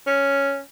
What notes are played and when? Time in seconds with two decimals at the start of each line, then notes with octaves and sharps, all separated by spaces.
0.07 C#4